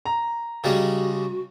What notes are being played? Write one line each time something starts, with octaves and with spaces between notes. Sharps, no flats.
A#5
C#3 G3 G#3 F#4